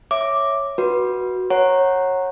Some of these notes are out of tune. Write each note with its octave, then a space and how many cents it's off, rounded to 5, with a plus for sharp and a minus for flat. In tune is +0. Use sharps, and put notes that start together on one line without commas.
C#5 -5 E5 +0 D6 +0
F#4 +0 B4 -20
C#5 -20 F#5 +0 A#5 -5